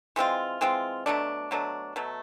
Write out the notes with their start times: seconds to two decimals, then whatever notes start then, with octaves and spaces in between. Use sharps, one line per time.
0.16 E3 G#3 C4 F4
0.61 E3 G#3 C4 F4
1.06 B2 F#3 A3 D4
1.51 B2 F#3 A3 D4
1.96 B2 F#3 A3